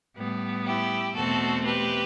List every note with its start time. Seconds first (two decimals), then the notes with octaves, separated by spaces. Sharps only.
0.17 A2 G3 B3
0.66 E4 G4
1.15 E2 B2 A3 C4 F#4 A4
1.65 G4 B4